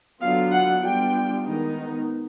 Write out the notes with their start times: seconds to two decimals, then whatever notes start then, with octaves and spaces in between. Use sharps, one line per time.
0.21 D3 F#3 B3 D4 F4 F5
0.52 F#5
0.82 G3 B3 D4 F4 G5
1.45 D#3 G#3 B3 D#4